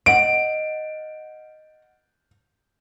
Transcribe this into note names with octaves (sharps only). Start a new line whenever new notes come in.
D#5 F#5 D7